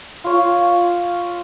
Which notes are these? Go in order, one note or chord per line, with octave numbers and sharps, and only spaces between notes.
F4 C#5